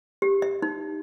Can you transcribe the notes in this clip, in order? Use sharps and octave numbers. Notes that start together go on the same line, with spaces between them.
G4
E5
D#4